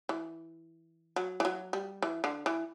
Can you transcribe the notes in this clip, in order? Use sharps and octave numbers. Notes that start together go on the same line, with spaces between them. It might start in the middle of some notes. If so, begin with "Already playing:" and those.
E3
F#3
E3
F#3
G3
E3
D3
E3